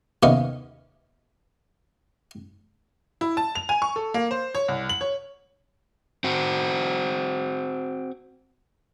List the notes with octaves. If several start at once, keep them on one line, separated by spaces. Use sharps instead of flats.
D#2 C3 B3 C#4 D#5 F5
E4
A5
F7
G#5
C#6
A4
A#3
C5
C#5
C2
F#7
C#5
C4 F#4